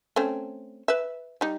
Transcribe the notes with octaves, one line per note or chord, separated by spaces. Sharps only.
A3 C4 C#4
B4 E5
G3 D#4